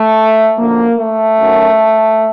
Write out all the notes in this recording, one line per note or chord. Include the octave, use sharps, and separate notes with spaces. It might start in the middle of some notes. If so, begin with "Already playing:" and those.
Already playing: A3
F#2 D3 F3 A#3
A3
F#2 D#3 F#3